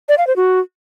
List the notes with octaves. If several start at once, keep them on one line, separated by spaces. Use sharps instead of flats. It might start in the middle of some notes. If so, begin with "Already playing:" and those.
D5
F5
C5
F#4